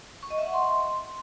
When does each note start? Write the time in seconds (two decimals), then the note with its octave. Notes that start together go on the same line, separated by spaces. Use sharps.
0.23 C#6
0.30 D#5
0.38 E5
0.46 F#5
0.54 C6